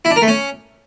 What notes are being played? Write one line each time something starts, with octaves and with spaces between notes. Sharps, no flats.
E4
D4
A#4
A3
C#4